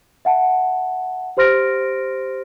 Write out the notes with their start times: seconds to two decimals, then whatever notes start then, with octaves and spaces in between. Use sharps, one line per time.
0.25 E5 F#5 A5
1.37 G4 C5 C6 F6 A#6 D7